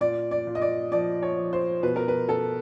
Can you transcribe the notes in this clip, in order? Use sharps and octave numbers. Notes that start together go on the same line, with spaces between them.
A#2 D5
D5
A#2
D#5
D5
F3 D5
C#5
F3
C5
B2 B4
A#4
B4
B2 A4